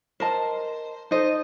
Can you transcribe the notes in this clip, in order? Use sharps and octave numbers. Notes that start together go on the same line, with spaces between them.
A#4 C5 D#5 A5
D#4 A4 C5 D#5